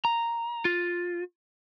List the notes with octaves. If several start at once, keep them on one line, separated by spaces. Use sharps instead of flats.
A#5
F4